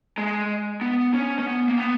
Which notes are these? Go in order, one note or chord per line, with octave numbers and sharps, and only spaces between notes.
G#3
B3
C#4
C#4
B3
A#3
B3